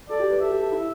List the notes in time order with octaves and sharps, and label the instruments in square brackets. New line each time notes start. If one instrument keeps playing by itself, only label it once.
[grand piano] A4 [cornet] D5
[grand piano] G4
B4
[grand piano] A4 [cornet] E5
[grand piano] G4
A4
E4